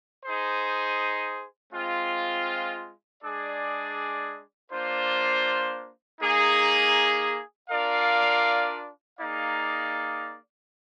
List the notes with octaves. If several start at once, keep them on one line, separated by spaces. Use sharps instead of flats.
D#4 G#4 C5
G#3 C4 F4
G#3 D4 G#4 D5
A#3 D4 F4 C5
A#3 D#4 G#4
D4 F4 A#4 D5 F5
A#3 D#4 G#4 D5 F5